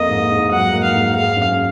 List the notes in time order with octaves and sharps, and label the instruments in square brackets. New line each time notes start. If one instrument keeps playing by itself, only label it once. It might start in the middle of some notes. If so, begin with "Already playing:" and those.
Already playing: [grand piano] F2 A#3 [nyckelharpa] D#5
[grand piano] G#2
G#2
[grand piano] F#3 [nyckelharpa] F#5
[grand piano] A#3
[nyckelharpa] F5
[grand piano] G#2
[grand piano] G#3 [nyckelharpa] F5
[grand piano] F#2